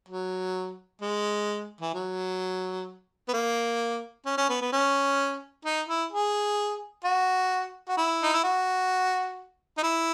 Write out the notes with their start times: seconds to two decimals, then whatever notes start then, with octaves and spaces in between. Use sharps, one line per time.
0.09 F#3
1.01 G#3
1.81 E3
1.95 F#3
3.28 B3
3.34 A#3
4.26 C#4
4.38 C#4
4.49 B3
4.61 B3
4.72 C#4
5.65 D#4
5.89 E4
6.12 G#4
7.04 F#4
7.88 F#4
7.97 E4
8.23 D#4
8.33 E4
8.44 F#4
9.77 D#4
9.83 E4